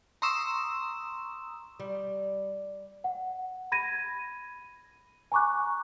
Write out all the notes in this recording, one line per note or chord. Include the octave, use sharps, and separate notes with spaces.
A#5 C6 C#6 D#6 E6 E7
G3
F#5
B5 G#6 A#6 D#7
G#5 A#5 C#6 D6 F#6